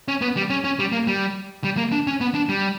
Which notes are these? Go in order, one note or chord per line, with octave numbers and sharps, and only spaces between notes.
C#4
B3
G3
C#4
C#4
G3
A#3
G3
G3
A#3
D4
C#4
B3
D4
G3